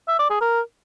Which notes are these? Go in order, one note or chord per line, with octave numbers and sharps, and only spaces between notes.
E5
D5
G#4
A#4